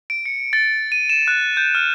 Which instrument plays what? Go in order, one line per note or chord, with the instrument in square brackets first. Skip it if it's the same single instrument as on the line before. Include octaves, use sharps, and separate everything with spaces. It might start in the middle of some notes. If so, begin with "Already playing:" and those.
[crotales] D7
C#7
A6
D#7
E7
F#6
G6
F6